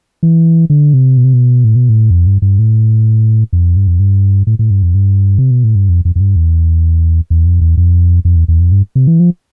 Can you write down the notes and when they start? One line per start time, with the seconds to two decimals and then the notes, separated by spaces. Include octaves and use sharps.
0.23 E3
0.70 D3
0.94 C3
1.17 B2
1.24 C3
1.34 B2
1.64 A2
1.76 B2
1.89 A2
2.11 F2
2.27 G2
2.42 G2
2.59 A2
3.53 F2
3.77 G2
3.87 F2
4.00 G2
4.47 A2
4.59 A2
4.71 G2
4.83 F2
4.95 G2
5.38 C3
5.51 B2
5.64 A2
5.75 G2
5.89 F2
6.05 F2
6.16 F2
6.20 G2
6.36 E2
7.30 E2
7.46 F2
7.61 E2
7.77 F2
8.25 F2
8.36 E2
8.48 E2
8.60 F2
8.72 G2
8.95 C3
9.07 E3
9.20 F3